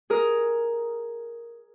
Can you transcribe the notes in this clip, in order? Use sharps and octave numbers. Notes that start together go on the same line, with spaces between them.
G#4 A#4